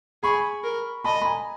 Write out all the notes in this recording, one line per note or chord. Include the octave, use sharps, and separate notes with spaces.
G#4 B5 C#6
A#4
D#5 A5 B5
B5
G#5 A#5